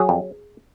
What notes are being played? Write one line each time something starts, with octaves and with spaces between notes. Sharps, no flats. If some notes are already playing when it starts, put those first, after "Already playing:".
Already playing: F#3 G#4
F2